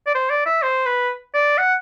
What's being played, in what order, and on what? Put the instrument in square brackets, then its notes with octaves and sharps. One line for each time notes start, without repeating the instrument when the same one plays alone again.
[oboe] D5
C5
D5
E5
C5
B4
D5
F#5